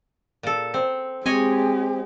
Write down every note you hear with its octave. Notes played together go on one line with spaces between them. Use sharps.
A#2 A4
C4
G#3 C4 G4 C#5 D#5 G#5